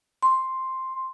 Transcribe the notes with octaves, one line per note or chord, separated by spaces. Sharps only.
C6